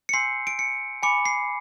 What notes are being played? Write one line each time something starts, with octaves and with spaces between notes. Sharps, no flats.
C#7
G#5 C6 E6 G6 C7
D7
C#7
G#5 B5 D6 C#7
C7